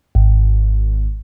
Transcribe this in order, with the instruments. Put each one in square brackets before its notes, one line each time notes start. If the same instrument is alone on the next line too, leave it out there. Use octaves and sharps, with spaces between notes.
[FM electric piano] G#1